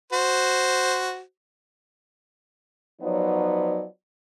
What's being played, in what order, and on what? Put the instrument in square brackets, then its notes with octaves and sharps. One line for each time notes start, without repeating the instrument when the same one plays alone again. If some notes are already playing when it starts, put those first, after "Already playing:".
[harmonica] F#4 C5
[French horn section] F3 F#3 B3 D#4 C#5 D5